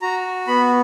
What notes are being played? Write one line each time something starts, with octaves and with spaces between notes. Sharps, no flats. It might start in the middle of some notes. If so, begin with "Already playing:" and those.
F#4 A#5
B3 B5